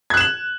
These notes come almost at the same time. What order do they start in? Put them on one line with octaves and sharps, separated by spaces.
G#6 F#6 E7 F#7